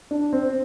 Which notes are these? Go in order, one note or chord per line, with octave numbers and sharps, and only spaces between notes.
D4
C4